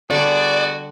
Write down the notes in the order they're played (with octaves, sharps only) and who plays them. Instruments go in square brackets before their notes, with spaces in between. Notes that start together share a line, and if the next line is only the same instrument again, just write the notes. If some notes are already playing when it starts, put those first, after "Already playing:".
[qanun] D3 G3 [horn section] B3 F#4 G#4 [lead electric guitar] D5